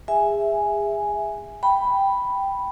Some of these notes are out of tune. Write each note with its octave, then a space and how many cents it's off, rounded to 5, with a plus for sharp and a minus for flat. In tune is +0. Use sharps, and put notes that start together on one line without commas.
G#4 -30 E5 +0 G#5 +0
G5 +0 B5 +0